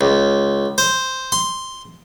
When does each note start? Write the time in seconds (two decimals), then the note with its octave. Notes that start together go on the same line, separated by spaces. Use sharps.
0.01 C#2
0.78 C5
1.32 C6